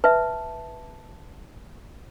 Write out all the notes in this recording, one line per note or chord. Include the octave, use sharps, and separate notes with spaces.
B4 E5 A5